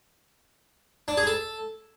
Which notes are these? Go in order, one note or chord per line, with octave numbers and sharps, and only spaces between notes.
D4
G#4
A4